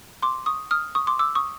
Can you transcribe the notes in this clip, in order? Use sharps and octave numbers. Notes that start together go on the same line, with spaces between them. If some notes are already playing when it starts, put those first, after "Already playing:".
C6 D6
C#6 D#6
D#6 F6
C#6 D#6
C6 D6
D6 E6
C#6 D#6